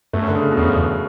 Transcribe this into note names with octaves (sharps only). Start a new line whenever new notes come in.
F#2 A3
D3
C#3
B2
E2 C#3
F#2
E2